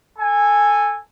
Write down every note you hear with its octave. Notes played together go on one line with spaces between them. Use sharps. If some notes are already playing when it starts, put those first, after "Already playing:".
A4 G#5